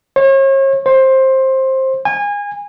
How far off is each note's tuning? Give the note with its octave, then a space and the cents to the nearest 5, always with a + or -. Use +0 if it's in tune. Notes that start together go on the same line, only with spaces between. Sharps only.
C#5 -40
C5 +15
G#5 -25